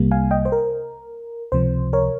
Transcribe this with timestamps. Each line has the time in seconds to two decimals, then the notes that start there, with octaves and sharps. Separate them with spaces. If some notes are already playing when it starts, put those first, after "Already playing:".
Already playing: C2 C3 G3 A#3
0.11 F5 G#5
0.31 D#5 G5
0.45 C5
0.52 A#4
1.52 C#2 C3 F3 C5
1.93 A#4 C#5